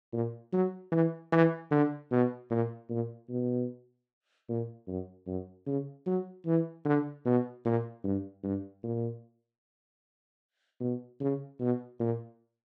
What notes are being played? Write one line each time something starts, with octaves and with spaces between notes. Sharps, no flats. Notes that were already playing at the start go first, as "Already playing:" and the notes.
A#2
F#3
E3
E3
D3
B2
A#2
A#2
B2
A#2
F#2
F#2
C#3
F#3
E3
D3
B2
A#2
G2
G2
A#2
B2
C#3
B2
A#2